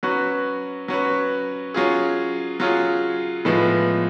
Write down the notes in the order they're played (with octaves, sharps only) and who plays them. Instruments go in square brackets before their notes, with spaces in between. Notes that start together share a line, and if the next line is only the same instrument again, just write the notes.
[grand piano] F#3 C#4 F#4 B4
F#3 C#4 F#4 B4
F#3 C#4 F4 G#4
F#3 C#4 F4 G#4
A2 F3 G#3 B3